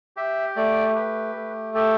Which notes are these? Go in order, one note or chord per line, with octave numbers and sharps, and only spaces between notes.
G4 E5
A3 D5
G4 B4
A3
G4 A4